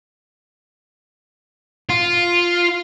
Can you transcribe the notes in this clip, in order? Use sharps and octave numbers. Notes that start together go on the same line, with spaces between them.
F4